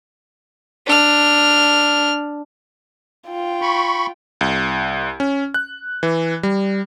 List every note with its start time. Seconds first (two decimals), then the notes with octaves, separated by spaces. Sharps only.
0.87 D4 F6
3.28 F4 G5
3.62 B5 C#6
4.41 C2
5.20 C#4
5.54 F#6
6.03 E3
6.43 G3